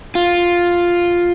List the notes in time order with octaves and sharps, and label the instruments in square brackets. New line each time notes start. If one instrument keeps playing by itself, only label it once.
[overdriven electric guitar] F4